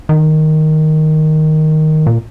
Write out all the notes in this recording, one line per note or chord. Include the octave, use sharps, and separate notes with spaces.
D#3
A#2